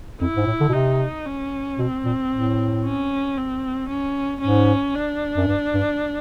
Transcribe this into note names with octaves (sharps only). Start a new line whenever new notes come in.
F2 E4
G#2
A2
D3
B2
C3 D#4
C#4
B2 C4
A#2
A2
C#4
C4
C#4
G#2 C#4
D4
F#2
G2
G2